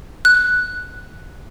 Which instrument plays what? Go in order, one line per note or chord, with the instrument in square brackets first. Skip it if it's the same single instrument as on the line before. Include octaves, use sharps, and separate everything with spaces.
[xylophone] F#6